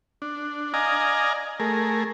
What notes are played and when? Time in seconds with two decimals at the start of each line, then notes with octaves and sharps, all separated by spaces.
0.22 D4
0.74 D5 D#5 F5 G#5 A#5
1.60 A3 G#4 A#4